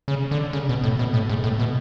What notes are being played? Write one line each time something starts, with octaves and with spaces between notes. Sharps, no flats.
C#3
D3
C#3
B2
A2
B2
A2
G#2
A2
B2